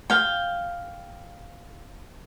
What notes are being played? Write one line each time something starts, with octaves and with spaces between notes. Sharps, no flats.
F5 G5